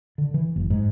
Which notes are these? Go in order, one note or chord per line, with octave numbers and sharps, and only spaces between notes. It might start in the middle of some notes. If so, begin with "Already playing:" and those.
D3
E3
F#1
G#2